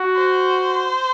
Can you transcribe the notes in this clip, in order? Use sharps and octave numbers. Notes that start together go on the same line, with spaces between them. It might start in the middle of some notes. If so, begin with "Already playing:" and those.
Already playing: F#4
C5